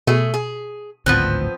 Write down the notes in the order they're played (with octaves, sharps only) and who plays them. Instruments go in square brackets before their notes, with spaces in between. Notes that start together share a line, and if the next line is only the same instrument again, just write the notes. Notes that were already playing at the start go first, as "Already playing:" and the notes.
[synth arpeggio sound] B2 [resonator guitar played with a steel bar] A3 G#4
[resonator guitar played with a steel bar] G#4
[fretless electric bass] G#1 D2 A2 [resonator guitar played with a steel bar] F3 B3 C4 [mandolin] F#6